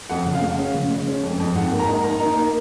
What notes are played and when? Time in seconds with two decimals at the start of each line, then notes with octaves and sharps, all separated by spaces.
0.09 F2 F#5
0.26 C#3
0.34 F5
0.42 G#3
0.58 C#4
0.74 C#3
0.91 G#3
1.07 C#4
1.23 F2
1.39 F2
1.55 G#2 F#5
1.72 A#3
1.79 A#5
1.87 D#4
2.04 A#3 A#5
2.20 D#4
2.36 A#3